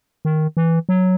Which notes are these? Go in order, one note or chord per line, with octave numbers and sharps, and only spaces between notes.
D#3
E3
F#3